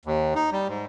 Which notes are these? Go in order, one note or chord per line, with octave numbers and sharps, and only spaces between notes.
D#2
D#4
G3
G#2